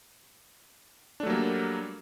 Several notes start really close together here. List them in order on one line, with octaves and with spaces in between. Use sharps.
D4 A3 F#3 A#3 G3